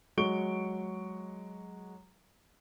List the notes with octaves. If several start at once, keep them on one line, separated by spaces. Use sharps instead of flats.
F#3 G#3 C#6 D7 G7